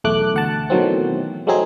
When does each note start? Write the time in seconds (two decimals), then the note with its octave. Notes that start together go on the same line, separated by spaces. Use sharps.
0.04 B1 E2 A3 D6 F#6
0.34 D2 F#5 A5
0.70 B2 D#3 E3 F#3 A3 C4
1.47 F#3 G#3 A3 C4 D#4 G#4